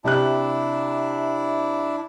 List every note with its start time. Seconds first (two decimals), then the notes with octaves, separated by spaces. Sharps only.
0.04 C3 D4 E4 G4 F#6